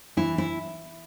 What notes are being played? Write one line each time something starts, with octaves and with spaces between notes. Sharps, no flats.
E3 E4
E4